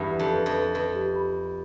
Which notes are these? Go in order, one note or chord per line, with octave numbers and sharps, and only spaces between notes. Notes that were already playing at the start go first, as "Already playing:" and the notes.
Already playing: E2 G2 E5 B5
B5
F2
B4
F2
B4
F2 B4
G4
B5